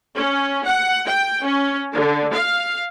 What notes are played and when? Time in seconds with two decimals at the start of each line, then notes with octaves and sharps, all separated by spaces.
0.15 C#4
0.65 F#5
1.06 G5
1.45 C#4
1.93 D3
2.33 F5